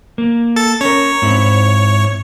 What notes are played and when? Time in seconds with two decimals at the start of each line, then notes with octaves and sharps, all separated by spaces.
0.18 A#3
0.56 A4 A6
0.81 C#4 A#4 C#5
1.22 G#2 C4 E4